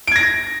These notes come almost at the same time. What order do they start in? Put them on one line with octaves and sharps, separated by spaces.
D7 G#6 A#6